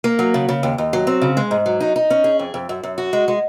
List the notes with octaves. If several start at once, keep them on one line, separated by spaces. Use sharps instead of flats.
A#3
F#3
C#3
C#3
D#2
D#2
F#3
C4
C#3
G#3
G#2
F#3
D#4
D#4
C#4
G#4
F2
F2
F#2
F#2
F#4
G#3
G#3